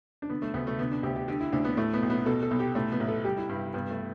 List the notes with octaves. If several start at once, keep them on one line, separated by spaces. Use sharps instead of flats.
D4
D3 B3
A3
D2 B3
A3
D3 B3
D4
D2 G4
G4
D3 G4
E4
D2 D4
B3
A2 A3
B3
B1
B3
B2 A4
A4
B1
G4
A2 A3
B3
A1
A4
G3 G4
E4
G2
G2 B3
A3